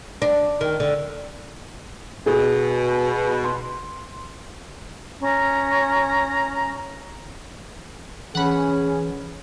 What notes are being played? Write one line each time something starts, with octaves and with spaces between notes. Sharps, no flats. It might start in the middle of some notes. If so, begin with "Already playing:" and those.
D4
D#3
D3
B2 G#4
C6
C#4 A#5
E3 C#4 G#4 F#5 B5